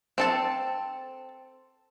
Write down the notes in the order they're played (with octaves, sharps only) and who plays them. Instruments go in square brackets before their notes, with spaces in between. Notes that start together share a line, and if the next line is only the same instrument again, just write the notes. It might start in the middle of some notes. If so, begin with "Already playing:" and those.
[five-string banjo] C4 A4 A5